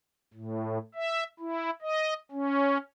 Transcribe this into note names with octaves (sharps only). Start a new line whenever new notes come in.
A2
E5
E4
D#5
C#4